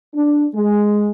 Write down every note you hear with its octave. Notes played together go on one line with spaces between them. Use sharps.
D4
G#3